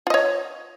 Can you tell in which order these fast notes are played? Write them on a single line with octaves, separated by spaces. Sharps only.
F4 D#5 C#5